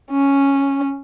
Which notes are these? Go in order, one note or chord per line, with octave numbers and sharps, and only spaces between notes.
C#4